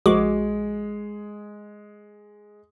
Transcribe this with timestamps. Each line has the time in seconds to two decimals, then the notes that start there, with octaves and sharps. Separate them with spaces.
0.06 A#1 G#3 F#4 G#4 D6